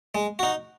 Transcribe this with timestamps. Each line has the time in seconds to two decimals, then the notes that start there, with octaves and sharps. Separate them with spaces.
0.15 G#3
0.39 D#4 F#4